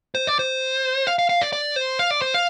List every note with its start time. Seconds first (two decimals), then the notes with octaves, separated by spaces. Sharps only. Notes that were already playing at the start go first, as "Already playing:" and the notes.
0.15 C5
0.27 D5
0.39 C5
1.07 F5
1.19 F5
1.29 F5
1.41 D5
1.53 D5
1.76 C5
1.99 F5
2.11 D5
2.22 C5
2.34 F5